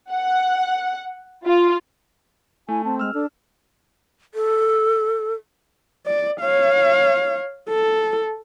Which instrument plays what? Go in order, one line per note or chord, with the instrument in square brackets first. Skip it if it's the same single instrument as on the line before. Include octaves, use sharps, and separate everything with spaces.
[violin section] F#5
F4
[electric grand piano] A3 [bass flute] E4 [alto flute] G#5
[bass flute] C4 [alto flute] A5
[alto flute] G#3 [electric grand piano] E6 F6
[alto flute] D4 [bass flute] A4
[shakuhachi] A4
[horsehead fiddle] D5
C#5 F5
A4